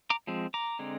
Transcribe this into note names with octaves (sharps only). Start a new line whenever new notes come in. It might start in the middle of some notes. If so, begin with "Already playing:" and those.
A#5 D6
F3 G#3 C4
A#5 D6
D3 G#3 C4